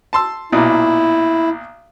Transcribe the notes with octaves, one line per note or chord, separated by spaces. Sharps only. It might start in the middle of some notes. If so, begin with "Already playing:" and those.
A5 C6 E6
B1 A#2 E4